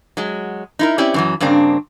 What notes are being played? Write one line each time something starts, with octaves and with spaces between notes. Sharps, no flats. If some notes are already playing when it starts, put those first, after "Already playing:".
F#3 G#3
D#4 E4 A#4
C4 C#4 E4 G4 D5
F#2 E3 F#3
G2 C#3 A#3 C4 D4